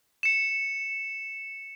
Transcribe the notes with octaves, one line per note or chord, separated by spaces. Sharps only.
C#7 E7